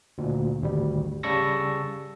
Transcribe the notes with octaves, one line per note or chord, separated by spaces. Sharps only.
D2 A#2
G#1 D2 G3
C#3 G3 A5 C#6 E6 A#6